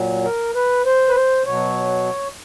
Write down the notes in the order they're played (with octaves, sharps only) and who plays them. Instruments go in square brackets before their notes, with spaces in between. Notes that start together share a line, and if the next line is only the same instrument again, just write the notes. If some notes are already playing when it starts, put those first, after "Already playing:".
Already playing: [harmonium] A#2 F#3
A#4
B4
C5
B4
C5
B2 F#3 C#5